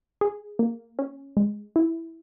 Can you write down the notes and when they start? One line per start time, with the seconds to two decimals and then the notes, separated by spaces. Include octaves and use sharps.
0.21 G#4
0.59 A#3
0.99 C#4
1.37 G#3
1.76 E4